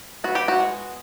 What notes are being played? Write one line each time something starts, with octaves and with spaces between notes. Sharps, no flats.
B3 F#4
G4
F#4
G#3